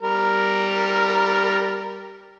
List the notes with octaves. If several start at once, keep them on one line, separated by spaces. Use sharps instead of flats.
G3 A#4